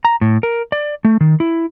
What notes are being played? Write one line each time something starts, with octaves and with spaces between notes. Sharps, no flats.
A#5
A2
A#4
D5
A3
D#3
E4